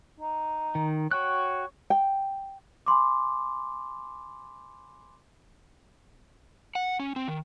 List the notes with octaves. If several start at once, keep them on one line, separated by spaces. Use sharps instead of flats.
D#4
D#3
F#4 C#5 G5 F#6
G5
G#5 B5 C6 D6
F#5
C#4
C4
D#3